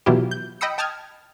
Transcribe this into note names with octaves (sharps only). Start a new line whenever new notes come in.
B2 E3 F#3 E4 F4 G4
G6
D#5 G5 B5 D#6 E6 C#7
G5 A5 D#6 F6 G#6